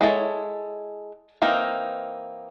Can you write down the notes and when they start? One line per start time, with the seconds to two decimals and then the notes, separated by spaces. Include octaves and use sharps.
0.01 G#3 E4 A4 C#5
1.42 E3 A#3 C4 D#4